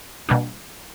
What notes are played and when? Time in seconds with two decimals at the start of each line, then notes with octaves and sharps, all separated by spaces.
0.29 B2 G3 A#3 D4